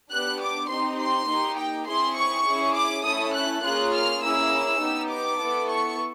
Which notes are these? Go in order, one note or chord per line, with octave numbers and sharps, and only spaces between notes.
B3 D4 G4 F#6
D6
C4 D#4 G4 C6
C6
A#3 D#4 G4
G5
C4 E4 G#4 C6
C#6
C#4 E4 G#4
D6
A3 C#4 E4 A4 D#6
F#6
A#3 C#4 F4 G#4 F#6
F6
A#3 C#4 E4 G#4 E6
B3 D#4 G4
D6
B3 E4 A4
C#6